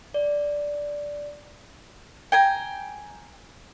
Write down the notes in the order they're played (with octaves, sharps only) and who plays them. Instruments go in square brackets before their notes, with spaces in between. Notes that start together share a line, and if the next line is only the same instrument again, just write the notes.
[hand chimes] D5
[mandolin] G5 G#5 A#5